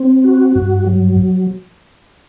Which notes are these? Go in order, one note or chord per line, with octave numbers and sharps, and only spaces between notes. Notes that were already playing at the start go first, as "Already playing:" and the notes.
Already playing: C4
F#4
G2
F#3